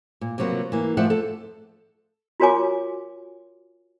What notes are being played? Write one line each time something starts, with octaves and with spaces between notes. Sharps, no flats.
A#2
C3 F3 F#3 A#3 B3
E3 A#3
F3 A3 C5 D5 E5 F#5
A4
F4 F#4 A#4 C#5 G#5 D6